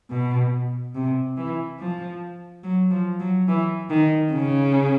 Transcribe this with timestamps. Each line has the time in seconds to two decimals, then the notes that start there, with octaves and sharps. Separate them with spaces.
0.11 B2
0.95 C3
1.37 E3
1.79 F3
2.63 F#3
2.91 F3
3.20 F#3
3.48 E3
3.90 D#3
4.32 C#3